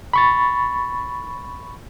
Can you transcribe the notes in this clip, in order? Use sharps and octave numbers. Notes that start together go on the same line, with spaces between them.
B5 C#6 A6